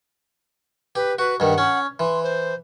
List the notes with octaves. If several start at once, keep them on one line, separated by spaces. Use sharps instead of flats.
G4 B4
F#4 B4
G2 D#3 F#5
C#4
E3 C6
C5